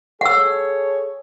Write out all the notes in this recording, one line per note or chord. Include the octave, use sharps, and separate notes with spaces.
G#4 A4 C#5 F#5 E6